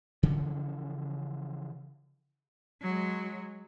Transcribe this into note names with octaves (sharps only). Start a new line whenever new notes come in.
C#3 E3 F3 C#4
F#3 G#3